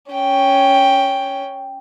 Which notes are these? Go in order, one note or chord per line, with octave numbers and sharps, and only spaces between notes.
C#4 G5